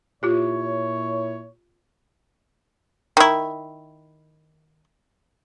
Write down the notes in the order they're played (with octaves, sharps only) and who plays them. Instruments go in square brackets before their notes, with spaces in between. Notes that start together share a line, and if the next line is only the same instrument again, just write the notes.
[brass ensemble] A#2 E4 C#5 [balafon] F4 G4
[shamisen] D#3 E4